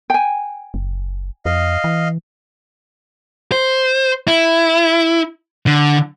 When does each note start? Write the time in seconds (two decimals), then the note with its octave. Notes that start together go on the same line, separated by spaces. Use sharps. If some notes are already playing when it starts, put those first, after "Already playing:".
0.10 G5 G#5
0.74 F#1
1.46 F2 D#5 F5
1.84 E3
3.52 C5
4.28 E4
5.67 D3